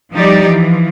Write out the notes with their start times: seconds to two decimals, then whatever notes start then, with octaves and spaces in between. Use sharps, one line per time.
0.14 F3 G3 D#4 G4 D5
0.46 E3 F3